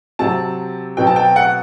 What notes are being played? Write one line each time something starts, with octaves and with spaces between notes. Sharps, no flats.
C3 F#3 C4 A5
B2 F#3 C4 G5
A5
G5
F#5